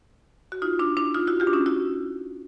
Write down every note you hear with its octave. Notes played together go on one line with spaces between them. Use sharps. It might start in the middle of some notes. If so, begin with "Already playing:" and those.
F#4
D#4 F4
D4 E4
D4 E4
D#4 F4
E4 F#4
F4 G4
D4
C#4 D#4
E4 F#4